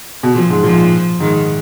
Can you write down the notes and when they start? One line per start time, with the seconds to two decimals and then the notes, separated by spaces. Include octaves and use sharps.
0.23 B2
0.35 A#2 F3
0.50 G#2
0.63 A#2 F3
1.20 G#2 D#3